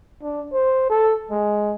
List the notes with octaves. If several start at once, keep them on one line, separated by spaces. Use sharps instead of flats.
D4
C5
A4
G#3